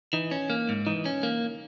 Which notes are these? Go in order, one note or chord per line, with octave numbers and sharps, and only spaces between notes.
E3 D#4
C#4
A#3
G#2
E3 D#4
C#4
A#3